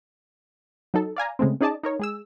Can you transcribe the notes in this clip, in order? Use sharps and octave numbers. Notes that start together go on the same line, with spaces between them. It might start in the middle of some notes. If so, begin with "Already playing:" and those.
F#3 D#4 A4
D5 F5 G#5 A#5
C#3 G#3 A3 C4
C#4 D#4 G#4 D5 D#5 A5
D#4 A#4 C#5
G#3 G#4 E6